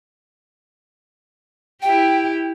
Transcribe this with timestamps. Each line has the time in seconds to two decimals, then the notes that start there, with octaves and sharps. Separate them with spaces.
1.82 E4 G4 G5